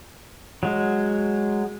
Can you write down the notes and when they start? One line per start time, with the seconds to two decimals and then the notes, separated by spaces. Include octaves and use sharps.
0.63 F#3 G#3